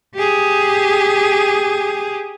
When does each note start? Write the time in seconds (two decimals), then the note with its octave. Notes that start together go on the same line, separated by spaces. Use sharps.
0.15 G4 G#4